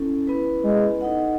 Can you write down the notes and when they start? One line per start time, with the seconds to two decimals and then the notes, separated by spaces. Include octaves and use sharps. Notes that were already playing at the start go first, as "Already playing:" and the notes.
Already playing: C#4 E4 A4
0.27 B3 E4 B4
0.64 G#3
1.01 D#4 A4 D#5 F#5